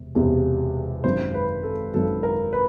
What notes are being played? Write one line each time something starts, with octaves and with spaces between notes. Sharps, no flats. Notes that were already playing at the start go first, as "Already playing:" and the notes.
Already playing: E1 C3
E1 E2 C3
G#1 F#2 D#3 F#3 C5
B4
A4
G#1 F#2 D#3 F#3 A4
A#4
B4